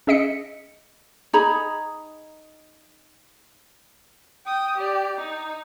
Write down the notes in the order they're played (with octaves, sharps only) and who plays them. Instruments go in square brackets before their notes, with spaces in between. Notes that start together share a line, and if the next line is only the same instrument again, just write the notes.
[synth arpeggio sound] C#4 G#4 D#5 B6 C#7
[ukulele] D#4 G#4 A#5 B5
[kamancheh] G5 D#6
G4 D5
D#4